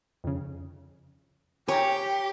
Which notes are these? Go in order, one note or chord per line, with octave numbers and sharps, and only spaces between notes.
F2 C#3
G4 C#5 G5 G#5 A#5